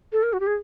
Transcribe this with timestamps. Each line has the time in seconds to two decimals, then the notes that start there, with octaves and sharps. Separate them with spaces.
0.12 A4
0.23 A#4
0.33 F#4
0.40 G4
0.47 G#4